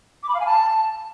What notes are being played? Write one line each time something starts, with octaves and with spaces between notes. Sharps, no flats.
D6
B5
F5
G#5
A5